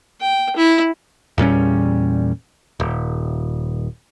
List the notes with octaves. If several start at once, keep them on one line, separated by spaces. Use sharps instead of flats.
G5
E4
E2 A#2 G3 C#4
D#1